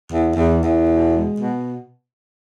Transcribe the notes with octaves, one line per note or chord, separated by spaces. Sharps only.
E2
E2
E2
B2
G#3
B2